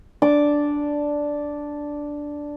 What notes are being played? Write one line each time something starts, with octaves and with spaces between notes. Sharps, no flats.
D4 D6